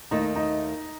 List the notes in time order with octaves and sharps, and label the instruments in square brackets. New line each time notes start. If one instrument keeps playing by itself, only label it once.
[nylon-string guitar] D#2 D#3 A3 [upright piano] D#4
[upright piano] D#4